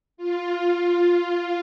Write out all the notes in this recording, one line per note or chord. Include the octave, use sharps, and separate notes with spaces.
F4